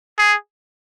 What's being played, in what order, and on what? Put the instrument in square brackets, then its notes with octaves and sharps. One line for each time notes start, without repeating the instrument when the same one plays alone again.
[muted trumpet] G#4